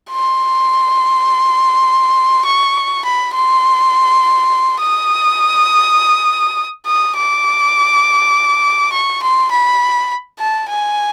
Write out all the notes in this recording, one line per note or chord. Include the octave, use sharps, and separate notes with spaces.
C6
C#6
B5
C6
D#6
D#6
D6
C#6
C6
B5
A5
G#5